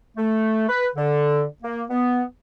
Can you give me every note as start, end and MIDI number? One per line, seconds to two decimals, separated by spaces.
0.17 0.69 57
0.69 0.87 71
0.96 1.43 50
1.63 1.83 58
1.89 2.22 59